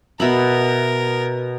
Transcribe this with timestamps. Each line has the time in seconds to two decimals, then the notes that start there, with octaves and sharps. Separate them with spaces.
0.20 B2 A#4 E5 B5